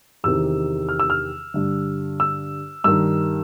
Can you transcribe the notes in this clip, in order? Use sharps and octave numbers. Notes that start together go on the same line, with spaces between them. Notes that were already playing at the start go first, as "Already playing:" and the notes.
E2 C3 D#3 E6
F6
E6
F6
G2 D3
E6
G2 D#3 E6